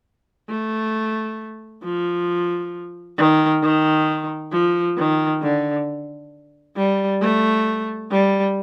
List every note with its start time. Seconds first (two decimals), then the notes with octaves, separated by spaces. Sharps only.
0.49 A3
1.84 F3
3.18 D#3
3.63 D#3
4.52 F3
4.97 D#3
5.42 D3
6.76 G3
7.21 A3
8.11 G3